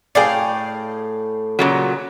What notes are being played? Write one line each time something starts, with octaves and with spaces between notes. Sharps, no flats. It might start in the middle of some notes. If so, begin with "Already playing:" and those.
A2 G#4 D5 F5 G5
A#2 C#3 F#3